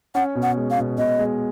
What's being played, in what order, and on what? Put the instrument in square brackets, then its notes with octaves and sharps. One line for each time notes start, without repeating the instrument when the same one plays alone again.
[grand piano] C#4 [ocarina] F#5
[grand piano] B2
[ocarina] F#5
[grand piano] G#3
[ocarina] F5
[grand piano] B2
[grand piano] B2 [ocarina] D#5
[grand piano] G#3